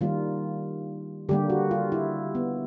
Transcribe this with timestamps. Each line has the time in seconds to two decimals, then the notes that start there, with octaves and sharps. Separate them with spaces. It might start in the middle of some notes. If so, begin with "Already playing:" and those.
0.01 D#3 G3 A#3 F4
1.29 D3 G3 A#3 G4
1.50 F#4
1.71 F4
1.92 E4
2.35 B3